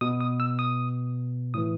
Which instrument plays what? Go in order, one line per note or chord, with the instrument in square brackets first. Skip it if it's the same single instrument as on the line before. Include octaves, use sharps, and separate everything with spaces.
[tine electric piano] B2 D#6
D#6
E6
D#6
A2 E3 D#6